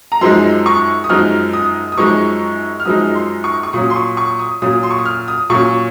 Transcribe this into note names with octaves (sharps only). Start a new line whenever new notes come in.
A#5
F#2 F3 G#3 D#4 C6
C#6
D#6
F#2 F3 G#3 D#4 F6
D#6
D#6
F#2 F3 G#3 D#4 C#6
F6
F#2 F3 G#3 D#4 D#6
C6
C#6
C#6
A#2 F#3 C#4 D#6
C6
C#6
C#6
D#6
A#2 F#3 C#4 D#6
C6
C#6
D#6
F6
D#6
A#2 F#3 C#4 C#6